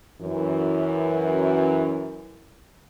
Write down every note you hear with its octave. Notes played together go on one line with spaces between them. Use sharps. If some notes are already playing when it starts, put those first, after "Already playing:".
F#2 E3